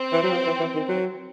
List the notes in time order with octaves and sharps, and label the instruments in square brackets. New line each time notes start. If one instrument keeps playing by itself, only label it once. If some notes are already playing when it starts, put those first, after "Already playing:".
Already playing: [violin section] C4
[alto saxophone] E3
F#3
F3
E3
E3
D#3
F#3